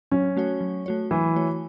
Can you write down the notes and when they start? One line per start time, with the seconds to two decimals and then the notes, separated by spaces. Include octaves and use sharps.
0.11 F#3 C#4
0.37 A3 F#4 C#5
0.61 F#3
0.86 A3 F#4 C#5
1.11 E3 F#3
1.36 A3 F#4 C#5